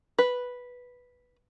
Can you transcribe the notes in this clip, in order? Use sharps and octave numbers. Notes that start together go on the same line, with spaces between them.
B4